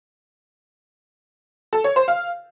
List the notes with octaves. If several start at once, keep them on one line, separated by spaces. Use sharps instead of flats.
A4
C#5
C5
F5